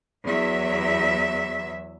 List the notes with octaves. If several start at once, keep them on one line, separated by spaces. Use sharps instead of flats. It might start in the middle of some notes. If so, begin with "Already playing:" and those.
E2 F#3 E5